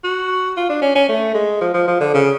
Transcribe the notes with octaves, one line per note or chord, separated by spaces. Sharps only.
F#4
F4
D4
C#4
C#4
A3
G#3
F3
F3
F3
D3
C#3